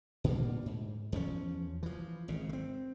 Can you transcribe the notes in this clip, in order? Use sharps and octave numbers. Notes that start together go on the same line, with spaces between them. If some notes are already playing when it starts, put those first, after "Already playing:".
A#2 D3 G3 A#3
G#2
E2 F3 C#4
E3 F3
G#1 C#3
G#3 C4